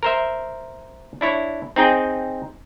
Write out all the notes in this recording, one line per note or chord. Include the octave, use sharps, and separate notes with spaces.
A#4 C5 E5
D4 E4 C#5
C4 D#4 G#4 G5